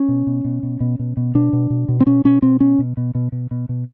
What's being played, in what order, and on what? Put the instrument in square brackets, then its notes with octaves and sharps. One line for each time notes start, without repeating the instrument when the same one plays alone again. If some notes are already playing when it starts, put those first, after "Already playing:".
Already playing: [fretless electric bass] C#4
B2
B2
B2
B2
B2
B2
B2
B2 D4
B2
B2
B2
C4
B2 C#4
B2 C#4
B2 C4
B2 C#4
B2
B2
B2
B2
B2
B2